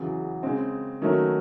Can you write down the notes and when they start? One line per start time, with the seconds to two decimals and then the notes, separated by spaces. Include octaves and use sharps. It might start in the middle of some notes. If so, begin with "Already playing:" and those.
Already playing: E2 C#3 F#3
0.43 C#3 G#3 C4
1.02 D#3 F#3 A3 C#4